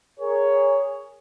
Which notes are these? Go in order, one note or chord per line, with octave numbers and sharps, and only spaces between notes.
G#4 A#4 C#5